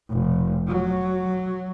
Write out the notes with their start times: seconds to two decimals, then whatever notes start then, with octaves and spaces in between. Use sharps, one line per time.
0.10 F1
0.67 F#3